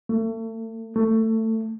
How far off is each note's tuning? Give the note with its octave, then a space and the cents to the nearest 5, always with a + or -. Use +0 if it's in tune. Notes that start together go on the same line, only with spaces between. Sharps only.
A3 +35
A3 +20